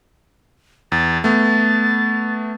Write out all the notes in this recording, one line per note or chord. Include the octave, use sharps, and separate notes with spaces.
E2 A6
A3 B3 A6